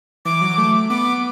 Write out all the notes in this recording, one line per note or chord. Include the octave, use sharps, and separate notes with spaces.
E3 D6
F#3
A3
B3 D6